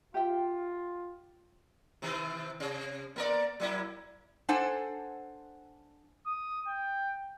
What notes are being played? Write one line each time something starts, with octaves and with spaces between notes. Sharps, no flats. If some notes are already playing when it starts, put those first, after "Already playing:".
F4 G4 E5 G5
C3 D#3 E3
C3
A#3 A#4 D5
F#3 A#3 E4
D4 A4 C5 F#5 G#5
D#6
G5